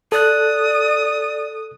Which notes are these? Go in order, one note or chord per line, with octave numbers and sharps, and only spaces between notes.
A4 D5 D#6 F#6